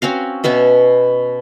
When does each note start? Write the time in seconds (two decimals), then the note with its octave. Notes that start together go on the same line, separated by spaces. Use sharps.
0.02 C4 C#4 F#4 F5
0.44 B2 B3 C#4 E5